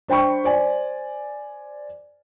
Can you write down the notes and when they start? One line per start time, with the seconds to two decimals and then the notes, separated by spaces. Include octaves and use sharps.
0.08 D4 C5 G5 B5 C#6
0.44 C5 D5 G#5